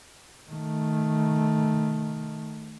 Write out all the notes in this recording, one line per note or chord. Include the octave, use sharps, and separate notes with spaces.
D#3 A3